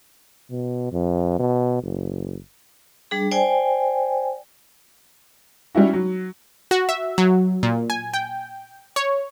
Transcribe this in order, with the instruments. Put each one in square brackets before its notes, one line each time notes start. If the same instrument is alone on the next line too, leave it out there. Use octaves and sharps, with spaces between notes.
[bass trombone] B2
F2
B2
F#1
[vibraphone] G3 D4 G#4
C5 D5 G5 G#5
[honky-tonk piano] G3 C#4 E4 F#4
F#3
[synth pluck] F#4
E5
F#3
A#2
G#5
G5
C#5